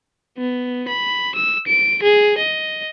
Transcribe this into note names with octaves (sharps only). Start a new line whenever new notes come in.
B3
B5
E6
D7
G#4
D#5